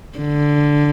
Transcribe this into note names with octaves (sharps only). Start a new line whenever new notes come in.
D3